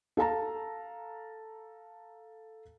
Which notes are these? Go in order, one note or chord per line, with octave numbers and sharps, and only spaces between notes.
A4 F5 A5 A#5